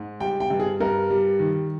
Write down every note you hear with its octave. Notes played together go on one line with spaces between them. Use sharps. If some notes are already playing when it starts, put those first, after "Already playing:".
Already playing: G#2
G3 G5
G5
G2
G#4
G2 A#4
G3
D#3